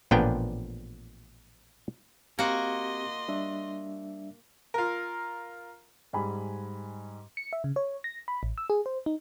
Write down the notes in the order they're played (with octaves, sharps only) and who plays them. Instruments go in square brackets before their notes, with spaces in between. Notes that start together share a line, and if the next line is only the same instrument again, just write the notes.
[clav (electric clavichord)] A1 A#2 F3 B3 D4 G5
[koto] A#3 F#4 [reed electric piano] C4 G4 F5 [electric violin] D#5 C6
[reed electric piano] G3 D4 E5
[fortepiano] F4 A#4
[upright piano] G#2 G3 G#5 B5
[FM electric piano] C#7
E5
C#3
C#5
A#6
B5
A1
E6
G#4
C5
D#4